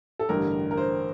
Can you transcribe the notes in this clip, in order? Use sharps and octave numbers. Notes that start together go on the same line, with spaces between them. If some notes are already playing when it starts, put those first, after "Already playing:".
A4
A1 G2 D3 G3 A#4
A#4
C5